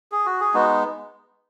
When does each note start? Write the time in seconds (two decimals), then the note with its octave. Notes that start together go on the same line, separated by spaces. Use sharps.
0.12 G#4
0.26 F#4
0.41 G#4
0.54 G#3 B3 D#4 F#4